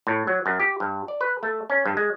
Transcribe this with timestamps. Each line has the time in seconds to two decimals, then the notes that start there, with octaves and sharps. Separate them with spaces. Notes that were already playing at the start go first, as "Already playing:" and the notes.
0.07 A2
0.27 F#3
0.46 F#2
0.60 G4
0.80 G2
1.08 D5
1.21 B4
1.43 A3
1.70 C#4
1.86 G2
1.97 G#3